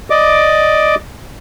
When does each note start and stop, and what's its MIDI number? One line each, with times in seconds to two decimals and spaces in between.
0.10 0.95 74
0.10 0.95 75
0.10 0.95 86